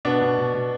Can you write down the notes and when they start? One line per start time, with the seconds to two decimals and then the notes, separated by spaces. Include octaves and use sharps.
0.05 B2 B3 D4
0.21 B2
0.38 B2
0.54 B2